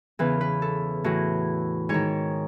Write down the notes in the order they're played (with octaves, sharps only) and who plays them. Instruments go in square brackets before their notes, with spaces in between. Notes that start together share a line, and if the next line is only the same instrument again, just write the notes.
[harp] E2 C#3 E3 B4
B4
A4
A2 E3 F#4
G#2 D#3 C#5